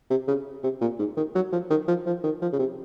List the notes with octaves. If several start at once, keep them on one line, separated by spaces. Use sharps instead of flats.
C3
C#3
C3
A#2
G#2
D#3
F#3
F3
D#3
F3
F3
D#3
F3
C#3
C3